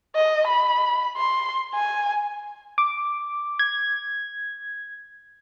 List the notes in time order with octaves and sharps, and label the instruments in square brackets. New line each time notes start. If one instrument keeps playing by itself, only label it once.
[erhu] D#5
B5
C6
G#5
[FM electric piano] D6
G#6